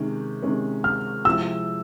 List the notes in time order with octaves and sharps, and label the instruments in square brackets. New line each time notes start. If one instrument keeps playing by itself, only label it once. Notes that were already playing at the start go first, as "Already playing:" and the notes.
Already playing: [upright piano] C3 D#3 G#3 C#4
C3 D#3 G#3 C#4
[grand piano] F6
[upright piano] C3 F3 G#3 C4 E4 [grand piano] E6